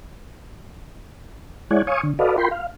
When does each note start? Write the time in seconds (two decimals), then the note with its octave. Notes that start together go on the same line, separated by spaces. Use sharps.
1.71 G#3 E4 C#5 D5 F#5 G#5
1.87 C#5 F5 G#5 C#6 D#6
2.03 D3
2.19 F#4 A4 B4 D5 D#5 F5
2.38 F4 A#4 G5 B5 C6
2.51 F5